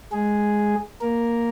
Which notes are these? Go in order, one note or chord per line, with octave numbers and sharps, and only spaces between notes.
G#3 G#4
A#3 A#4